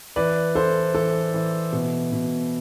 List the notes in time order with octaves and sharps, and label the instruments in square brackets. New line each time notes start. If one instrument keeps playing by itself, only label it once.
[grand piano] E3 B4 D5
E3 A4 C5
E3 A4
E3
B2
B2